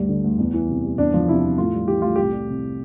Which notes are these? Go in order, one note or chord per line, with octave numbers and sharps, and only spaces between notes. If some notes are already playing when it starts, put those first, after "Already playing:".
Already playing: D2 G2 G3
D3
D2
E2
E3
C3
G3
E2 D4
F3
C3 E4
E2
A2 F4
G3
E3 G4
A2 F4
C2 G4
G3
C3